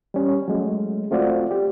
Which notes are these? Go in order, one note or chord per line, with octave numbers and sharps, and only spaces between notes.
G3 C#4
F#3 G#3 A3
A3 C4 F4 F#4 D5
G4